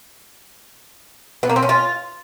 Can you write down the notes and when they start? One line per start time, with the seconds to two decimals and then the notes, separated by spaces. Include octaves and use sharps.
1.43 B3
1.49 A#3
1.56 C4
1.63 C#4
1.69 F4